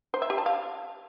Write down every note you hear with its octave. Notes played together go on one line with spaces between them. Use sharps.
C5
E5
G4
A5
F5